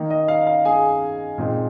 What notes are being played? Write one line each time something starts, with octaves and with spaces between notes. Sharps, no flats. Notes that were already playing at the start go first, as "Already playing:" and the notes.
Already playing: D#3 A#3 D#4
D#5
F5
F5
G#4 G#5
A#2 G#3 C4 D#4